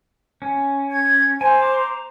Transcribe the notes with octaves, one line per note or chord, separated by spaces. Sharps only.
C#4
G#6
C5 G#5
A#5 D6